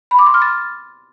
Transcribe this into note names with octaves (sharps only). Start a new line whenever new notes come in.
B5
D6
C6
F6
A6